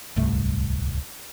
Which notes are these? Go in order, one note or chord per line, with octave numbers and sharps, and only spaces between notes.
D1 C2 G2 A3